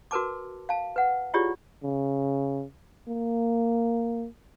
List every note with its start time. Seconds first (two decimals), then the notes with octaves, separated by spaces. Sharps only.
0.11 F#4 A#4 B4 A5 D6
0.69 F5 A5
0.96 B4 F#5
1.34 E4 F4 G4 G#4 C#5 D5
1.83 C#3
3.08 A#3